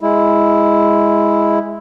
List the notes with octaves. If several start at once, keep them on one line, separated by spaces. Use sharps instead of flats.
G#3 E4